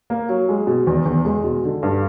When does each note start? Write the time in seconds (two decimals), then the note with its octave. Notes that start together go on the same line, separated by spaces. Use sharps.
0.10 A#3
0.29 F#3
0.49 G#3
0.67 B2
0.87 E2
1.05 E2
1.25 G#3
1.44 B2
1.64 D3
1.83 G2